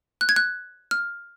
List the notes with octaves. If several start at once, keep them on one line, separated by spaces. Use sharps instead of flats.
F#6
G#6
F#6
F6